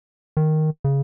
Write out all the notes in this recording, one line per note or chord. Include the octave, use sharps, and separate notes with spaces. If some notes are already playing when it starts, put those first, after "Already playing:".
D#3
C#3